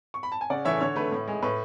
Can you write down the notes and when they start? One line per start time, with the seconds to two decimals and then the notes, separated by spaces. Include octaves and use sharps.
0.14 C#6
0.23 B5
0.32 A5
0.41 G#5
0.50 C#3 D5 F#5
0.65 E3 A3 C#5 E5
0.81 D3 C#5
0.96 A3 B4
1.12 A2
1.28 G#3
1.42 A2 B4